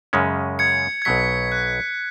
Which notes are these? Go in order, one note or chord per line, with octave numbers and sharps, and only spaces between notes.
F#2 C#3 G#3 C#4
G#6 C#7
G#6
B1 B2 F#3 B6
F#6